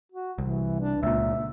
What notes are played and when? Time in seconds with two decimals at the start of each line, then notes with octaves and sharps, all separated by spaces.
0.12 F#4
0.38 C2 E3
0.81 D4
1.03 C#2 A#2 E5